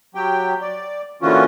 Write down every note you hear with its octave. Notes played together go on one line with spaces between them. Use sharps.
F#3 G4 G5
D5
A#2 D3 E3 C#4 F4 F#4